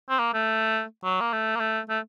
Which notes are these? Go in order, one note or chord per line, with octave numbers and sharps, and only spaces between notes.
C4
A#3
A3
F#3
A#3
A3
A#3
A3
A3